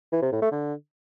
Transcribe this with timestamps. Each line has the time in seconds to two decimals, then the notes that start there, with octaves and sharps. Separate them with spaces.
0.12 E3
0.22 C3
0.32 A2
0.42 A3
0.52 D3